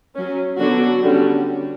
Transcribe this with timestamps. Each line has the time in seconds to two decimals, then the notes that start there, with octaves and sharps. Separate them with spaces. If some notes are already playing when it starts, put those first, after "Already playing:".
0.15 F#3 C#4
0.59 D3 F#3 B3 D4 F#4
1.03 D3 G3 C#4